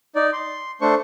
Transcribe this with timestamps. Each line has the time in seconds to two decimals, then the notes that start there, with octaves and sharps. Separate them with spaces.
0.15 D#4 D5
0.33 C6
0.81 A3 D4 C5 C#6